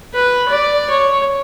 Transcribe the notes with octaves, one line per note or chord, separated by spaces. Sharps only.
B4
D5
C#5